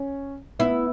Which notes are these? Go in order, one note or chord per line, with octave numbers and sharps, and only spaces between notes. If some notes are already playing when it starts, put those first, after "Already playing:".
Already playing: C#4
B3 E4